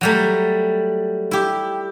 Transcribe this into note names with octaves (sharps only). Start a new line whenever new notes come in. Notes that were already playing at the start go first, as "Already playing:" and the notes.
F#3 G3 A3
E4 G4